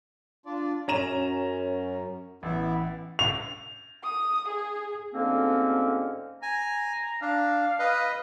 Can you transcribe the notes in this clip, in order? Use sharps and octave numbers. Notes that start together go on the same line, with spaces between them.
D4 F4 D5
F#2 C#4 A#5 E7
A1 B3 E4 E5
F7
D#6
G#4
D2 G#2 D3 A#3 C4 C#4
G#5 A#5
D4 F5
B4 D#5